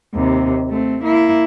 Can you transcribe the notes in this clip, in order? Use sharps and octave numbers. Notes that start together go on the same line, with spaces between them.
D#2 C3
A3 C4
A#3 E4